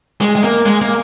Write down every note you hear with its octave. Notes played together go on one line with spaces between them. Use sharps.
G#3
G#3
A#3
G#3
A#3